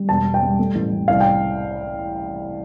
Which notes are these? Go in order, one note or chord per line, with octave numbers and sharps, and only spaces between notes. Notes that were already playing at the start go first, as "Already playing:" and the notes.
Already playing: G3
E1 A5
E1
G5
G3
A3
A1
A1
C2 F5
G5